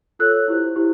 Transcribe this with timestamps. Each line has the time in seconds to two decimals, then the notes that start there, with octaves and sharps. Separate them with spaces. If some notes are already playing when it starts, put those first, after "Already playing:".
0.19 F4 A4 C#5 E6 F#6
0.48 E4 G4 C5
0.76 E4 G4 C5